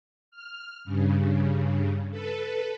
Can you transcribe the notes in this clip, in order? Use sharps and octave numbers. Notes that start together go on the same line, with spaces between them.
F6
G2 C#3
A4 B4